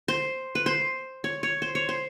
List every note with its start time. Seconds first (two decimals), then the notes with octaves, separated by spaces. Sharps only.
0.08 C5
0.55 B4
0.66 C5
1.24 C#5
1.43 C#5
1.62 C5
1.75 C#5
1.89 C5